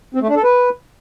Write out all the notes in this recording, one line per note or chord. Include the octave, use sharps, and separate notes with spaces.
C4
A3
D4
A4
B4